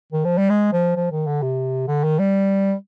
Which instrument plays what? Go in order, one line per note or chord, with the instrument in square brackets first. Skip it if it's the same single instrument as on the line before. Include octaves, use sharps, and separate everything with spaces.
[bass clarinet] D#3
F3
G3
G#3
F3
F3
D#3
D3
C3
D3
D#3
G3